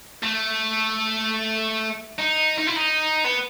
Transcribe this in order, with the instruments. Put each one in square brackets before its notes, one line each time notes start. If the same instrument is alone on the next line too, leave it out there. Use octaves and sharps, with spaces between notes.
[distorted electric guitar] A3
D#4
D#4
E4
D#4
B3